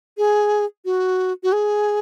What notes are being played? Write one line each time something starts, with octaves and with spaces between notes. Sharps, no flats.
G#4
F#4
F#4
G#4